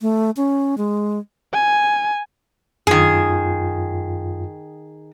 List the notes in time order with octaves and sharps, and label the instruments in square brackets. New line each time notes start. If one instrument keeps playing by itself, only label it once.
[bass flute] A3
C#4
G#3
[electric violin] G#5
[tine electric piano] F#2 F4 [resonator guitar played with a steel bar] D#3 G#4